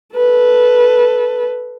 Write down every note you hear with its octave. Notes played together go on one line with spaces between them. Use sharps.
A4 B4